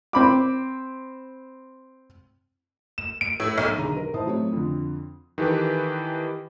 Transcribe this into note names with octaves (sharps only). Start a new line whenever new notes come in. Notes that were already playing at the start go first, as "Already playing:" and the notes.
C4 B5 D6
E7
D7
A2
B1
B1 D3 D#3 G#4 A#5 D#7
A#4
A1 E4 C5 A5 D#6
F#3 A3 C4 C#5
F2 D3
D#3 E3 G4 A4 B4